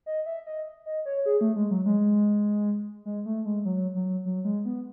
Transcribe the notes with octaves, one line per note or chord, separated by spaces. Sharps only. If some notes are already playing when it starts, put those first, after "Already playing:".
D#5
E5
D#5
D#5
C#5
G#4
A3
G#3
F#3
G#3
G#3
A3
G#3
F#3
F#3
F#3
G#3
B3